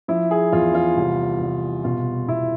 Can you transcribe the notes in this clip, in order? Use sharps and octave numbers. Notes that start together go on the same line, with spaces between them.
F3 E4
G#4
E2 F4
F4
C2
C2
B2 F4
B2 E4